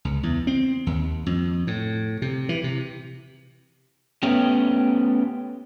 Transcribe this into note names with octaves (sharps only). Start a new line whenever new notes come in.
C#2
E2
C4
D#2
F2
A2
C3
E3
C3
A3 B3 C#4 G4